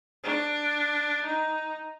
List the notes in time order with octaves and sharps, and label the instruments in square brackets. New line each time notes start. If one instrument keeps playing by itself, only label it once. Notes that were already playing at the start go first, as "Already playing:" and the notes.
[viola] D4
D#4